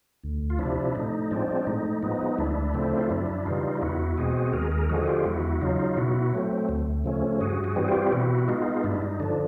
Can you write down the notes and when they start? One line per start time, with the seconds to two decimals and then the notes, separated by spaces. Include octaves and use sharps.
0.24 D2
0.50 F4
0.59 C3 F3 D4 E4
0.95 A2 D#4
1.31 F3 G#3 C4 D4
1.67 A2 D#4
2.02 F3 G#3 B3 D#4
2.38 D2 D4 E4
2.74 C#3 F3 A3 C4
2.99 F4
3.10 F#2 D4 E4
3.46 C#3 E3 G3 D#4 F4
3.82 E2 E4 F#4
4.17 B2 G#3 C4 F#4 G#4
4.53 D#2 G#4 A#4
4.71 G#4 A#4
4.89 D3 F3 G#3 F#4 G#4
5.07 F4 G4
5.25 E2 E4 F#4
5.61 C#3 F#3 D#4 F4
5.97 B2 E4 F#4
6.33 F#3 A3 C4
6.69 D2
7.04 C#3 F3 A3 C#4
7.40 G2 F#4 G#4
7.64 F#4 G#4
7.76 E3 G3 C4
7.88 F4 G4
8.12 B2 E4 F#4
8.48 G#3 B3 D#4 F4
8.84 G2 D4 E4
9.02 D#4
9.20 D3 F3 D4